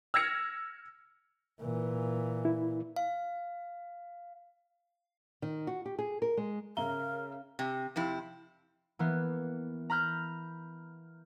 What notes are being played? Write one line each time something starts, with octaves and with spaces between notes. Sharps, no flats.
E6 F6 G#6 A#6 C#7
A#2 E3
E4
F5
D#3
F#4
G4
G#4
A#4
G#3
C#3 A#4 E5 A#5 G7
C3
F2 C3 E4
E3 A#3 B3
A#5 B5 F6 G6